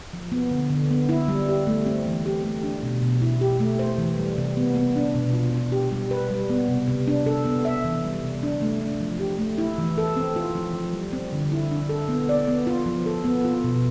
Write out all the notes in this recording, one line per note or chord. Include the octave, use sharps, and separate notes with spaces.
F3
B3
D3
D3
B3
E4
G3
G4
A3
C4
E3
G4
A3
D4
B2
B2
E4
G4
A3
C5
E3
G3
C3
B3
B3
D4
B2
F4
D4
G4
G3
B4
G3
B3
C3
C3
D4
A4
B3
E5
E3
G3
C3
D4
A3
D4
F3
G4
A3
E4
E3
A4
C4
F4
F3
F3
G3
C4
D3
E4
D4
A4
B3
D5
B3
F4
F3
A4
B3
F4
B2